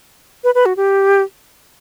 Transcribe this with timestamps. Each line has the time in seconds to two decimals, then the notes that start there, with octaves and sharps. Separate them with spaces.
0.44 B4
0.55 B4
0.66 F#4
0.77 G4